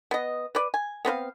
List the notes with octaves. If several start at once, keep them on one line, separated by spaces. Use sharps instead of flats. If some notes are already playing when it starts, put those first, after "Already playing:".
B3 D#5
B4 D5
G#5
B3 C4 B4 F5